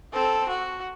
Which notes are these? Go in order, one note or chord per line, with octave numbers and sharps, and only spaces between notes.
C4 A4
F#4